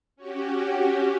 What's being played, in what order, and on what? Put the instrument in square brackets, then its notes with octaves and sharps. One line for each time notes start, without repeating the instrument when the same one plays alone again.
[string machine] C#4 F#4 G4